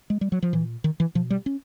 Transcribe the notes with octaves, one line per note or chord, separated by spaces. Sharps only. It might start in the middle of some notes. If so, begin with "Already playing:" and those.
G#3
G3
F#3
F3
A#2 E3
D#3
E3
B2 F3
G3
C#4